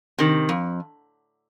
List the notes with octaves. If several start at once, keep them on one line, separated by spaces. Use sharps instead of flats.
C3 D#3
F2